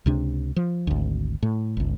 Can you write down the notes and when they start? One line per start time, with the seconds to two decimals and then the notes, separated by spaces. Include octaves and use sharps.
0.06 C#2 C3 D4
0.56 F3
0.87 G#1 D2
1.43 A2
1.77 G1 C#2